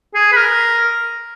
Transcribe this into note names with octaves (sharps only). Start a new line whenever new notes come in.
G#4
B4
A#4